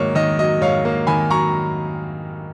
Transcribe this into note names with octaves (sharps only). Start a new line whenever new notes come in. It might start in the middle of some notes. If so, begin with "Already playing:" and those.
Already playing: G#2 D#3 F#3 A#3 C#5
D#3 D#5
F#3 D#5
G#2 C#5 F5
A#3
D#3 G#5 B5
F#3 A#5 C#6